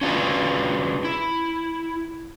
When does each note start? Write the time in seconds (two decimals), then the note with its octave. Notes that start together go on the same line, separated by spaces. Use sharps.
0.01 C#4 D4 F4 F#4 G#4 B4
1.05 E4